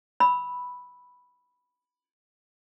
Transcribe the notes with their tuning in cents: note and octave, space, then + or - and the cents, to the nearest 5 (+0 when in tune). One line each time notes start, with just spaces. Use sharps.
B5 +0 E6 -20